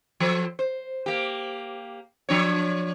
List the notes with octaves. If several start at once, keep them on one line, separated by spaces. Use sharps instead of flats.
F3 A4 C5
C5
A#3 G4
F3 D4 C#5